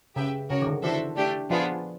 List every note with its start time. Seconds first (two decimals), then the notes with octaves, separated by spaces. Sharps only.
0.16 C#3 G4 B4 E5 G5
0.50 C#3 F#4 A#4 C#5
0.62 D#3
0.67 D3
0.83 E3 D4 F#4 A4 C5 E5
1.17 A3 D4 G4
1.50 F3 B3 D4 F4 G#4